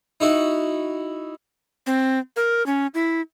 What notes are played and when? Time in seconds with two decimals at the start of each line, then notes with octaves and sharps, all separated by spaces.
0.20 D#4 E4 F#4
1.87 C4
2.36 A#4
2.66 C#4
2.94 E4